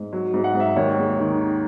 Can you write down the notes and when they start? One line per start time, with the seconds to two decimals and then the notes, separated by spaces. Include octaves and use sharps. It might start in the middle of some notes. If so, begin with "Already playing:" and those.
Already playing: G#2
0.13 F#3
0.34 G#2
0.44 F#5
0.55 G#2
0.60 E5
0.76 D#2 C#5
0.98 G#3
1.19 D#3